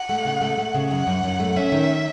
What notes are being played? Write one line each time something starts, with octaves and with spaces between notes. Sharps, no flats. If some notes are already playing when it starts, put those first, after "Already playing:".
Already playing: F#5
A3
C#3
A3
A3
C#3
F#2 F#5
F#2
F#2
A3
C#4 E5
D#3